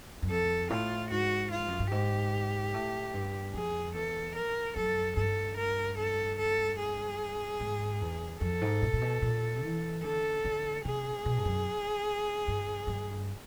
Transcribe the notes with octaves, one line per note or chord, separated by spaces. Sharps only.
F#2
F2 A4
A2 F4
G#2 F#4
F4
F#2
G2
G#2 G4
A2
G2
F2 G#4
E2 A4
A#4
F#2 A4
G2 A4
A#4
A4
A4
G#4
G#2
E2
F2 A4
G#2
A#2
A#2
B2
A#2
E3
D3 A4
D3
C3 G#4
B2
G2
F#2
G2
G2